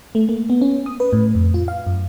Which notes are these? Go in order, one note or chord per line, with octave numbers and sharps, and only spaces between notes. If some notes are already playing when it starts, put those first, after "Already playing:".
A3
A#3
B3
C#4
D#6
B4
A2
F2
F4
F5
F#2